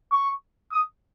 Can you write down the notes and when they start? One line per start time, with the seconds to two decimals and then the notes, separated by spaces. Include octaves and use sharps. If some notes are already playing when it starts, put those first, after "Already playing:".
0.12 C#6
0.72 D#6